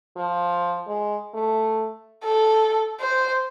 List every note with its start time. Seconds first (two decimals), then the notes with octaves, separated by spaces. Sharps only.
0.16 F3
0.87 G#3
1.34 A3
2.25 A4
3.00 C5